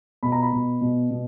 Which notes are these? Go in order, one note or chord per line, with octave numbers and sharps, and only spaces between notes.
B2 B5
A#5
B5
B2
B2
B2